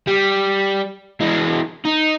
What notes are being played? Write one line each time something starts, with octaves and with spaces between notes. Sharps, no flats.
G3
E3 G#3
D#4